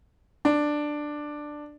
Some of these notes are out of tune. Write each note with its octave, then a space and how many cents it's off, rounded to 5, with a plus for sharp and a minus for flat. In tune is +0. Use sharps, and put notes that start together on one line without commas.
D4 +10